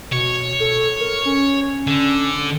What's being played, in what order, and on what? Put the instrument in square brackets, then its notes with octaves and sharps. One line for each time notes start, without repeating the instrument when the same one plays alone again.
[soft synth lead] B2 [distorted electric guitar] C#5
[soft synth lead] A4
A#4
C#4
[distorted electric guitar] D3